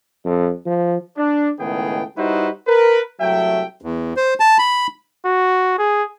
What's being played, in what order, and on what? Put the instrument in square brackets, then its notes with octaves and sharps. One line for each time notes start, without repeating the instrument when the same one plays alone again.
[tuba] F2
F3
[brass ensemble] D4
C#2 A2 D#3 B3 G#4 G5
G3 D#4 E4 F#4 B4 C5
A#4 B4
C2 F#3 A3 E5 G5
[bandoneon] E2
C5
A5
B5
[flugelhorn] F#4
G#4